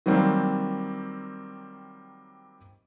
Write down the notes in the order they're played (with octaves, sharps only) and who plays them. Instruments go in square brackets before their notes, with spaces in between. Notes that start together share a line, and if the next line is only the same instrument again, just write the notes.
[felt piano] D#3 F#3 G3 A#3 C4